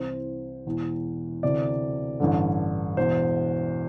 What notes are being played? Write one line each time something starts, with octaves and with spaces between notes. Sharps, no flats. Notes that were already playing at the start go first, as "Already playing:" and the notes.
Already playing: C2 C3 E3 C5
E1 E2 E3
D2 C3 E3 D5
A1 G2 D3
E1 E2 E3 C5